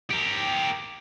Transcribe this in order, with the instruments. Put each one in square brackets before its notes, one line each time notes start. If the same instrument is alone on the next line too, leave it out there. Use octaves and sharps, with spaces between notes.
[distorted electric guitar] G4 A#4